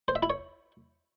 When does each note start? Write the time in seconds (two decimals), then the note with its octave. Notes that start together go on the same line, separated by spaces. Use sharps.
0.08 C5
0.15 E5
0.23 E4
0.30 C#5